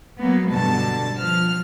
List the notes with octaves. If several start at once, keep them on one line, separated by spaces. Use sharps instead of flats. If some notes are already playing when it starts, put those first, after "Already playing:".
F#3 A#3 B3
G2 B2 D3 A5
F3 F6